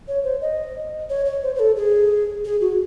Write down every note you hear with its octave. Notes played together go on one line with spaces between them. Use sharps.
C#5
C5
D#5
C#5
C#5
C5
C5
A4
G#4
G#4
F#4